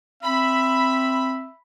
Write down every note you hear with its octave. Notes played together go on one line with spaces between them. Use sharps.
C4 E5 B5